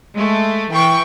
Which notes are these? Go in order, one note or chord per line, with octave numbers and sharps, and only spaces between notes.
G#3 A3
E3 G5 C#6